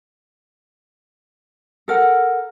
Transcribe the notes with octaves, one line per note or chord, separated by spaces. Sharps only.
A4 A#4 F#5